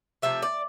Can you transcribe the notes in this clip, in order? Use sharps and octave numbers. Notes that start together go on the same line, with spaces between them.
C3 F3 A3 E5
D5